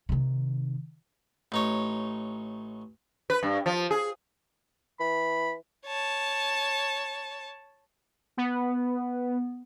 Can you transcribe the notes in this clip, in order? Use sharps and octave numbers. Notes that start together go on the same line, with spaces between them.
C3 D#3
A1 D#4 C#5
B4
G2
F3
G#4
E3 B5
C#5 A5
B3